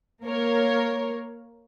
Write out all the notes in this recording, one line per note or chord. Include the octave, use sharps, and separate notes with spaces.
A#3 A#4 C#5